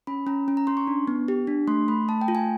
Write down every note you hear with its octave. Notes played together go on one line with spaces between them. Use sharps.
C#4 B5
C#4 A#5
C#4
A#5
C#4 C6
C#6
D4
B3
G4
D4
A3 C6
A3 B5
A3 A5
G5
F4
G#5